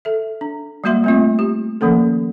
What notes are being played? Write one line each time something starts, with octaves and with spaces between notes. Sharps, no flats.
A4 E5
D4
G3 G#3 A#3 F#4 E5 C6
A3 C4 F4
G4
D#3 F3 A#3 C#4 A4